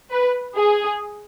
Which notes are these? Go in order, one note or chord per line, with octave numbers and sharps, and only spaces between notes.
B4
G#4